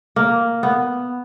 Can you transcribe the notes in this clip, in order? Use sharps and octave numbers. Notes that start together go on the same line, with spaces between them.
A#3
B3